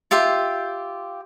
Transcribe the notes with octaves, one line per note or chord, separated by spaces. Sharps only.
F4 G4 E5 C6